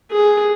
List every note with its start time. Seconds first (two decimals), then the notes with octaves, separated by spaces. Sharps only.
0.11 G#4